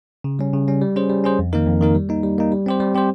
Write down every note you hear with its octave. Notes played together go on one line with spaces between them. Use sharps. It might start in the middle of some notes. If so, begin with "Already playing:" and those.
C#3
G3 C#4
C#3
G3 C#4
G3
C#4 G#4 C5
G3
C#4 G#4 C5
F2
D#3 A#3 D#4 A#4
F2
D#3 A#3 D#4 A#4
G3
A#3 D#4
G3
A#3 D#4
G3
C4 G4 C5
G3
C4 G4 C5